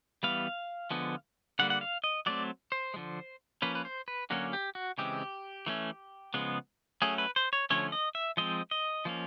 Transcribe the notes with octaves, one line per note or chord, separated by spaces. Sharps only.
E3 G3 B3 F5
D3 F3 G#3 B3
D3 G3 A#3 F#5
F#5
F5
D#5
F#3 A3 C4 D5
C5
D3 F3 G#3
F3 A#3 C#4 B4
B4
C5
B4
D3 F#3 A#3 C#4 F#4
G4
F#4
C#3 E3 G#3 C4 G4
E3 A3 C#4
C#3 F3 G#3 B3
F#3 A3 C#4 G#4
B4
C5
C#5
D3 F3 A3 C#4 C#5
D#5
E5
F3 G#3 C4 D#5
D#5
F3 A#3 C#4